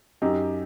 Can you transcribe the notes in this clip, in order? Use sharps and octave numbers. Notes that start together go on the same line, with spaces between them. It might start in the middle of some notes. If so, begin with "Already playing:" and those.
F#2 D#4 G4